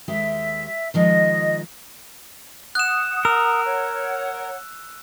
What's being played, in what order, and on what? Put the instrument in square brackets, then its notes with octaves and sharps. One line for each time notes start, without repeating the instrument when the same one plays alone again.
[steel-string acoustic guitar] D#2 G#3 G4 [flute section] E5
[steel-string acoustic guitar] D#3 F3 G#3 [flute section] D#5
[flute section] F#5 D#6 [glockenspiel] F#6 E7
[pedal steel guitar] A#4 [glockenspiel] E6
[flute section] C#5 F#5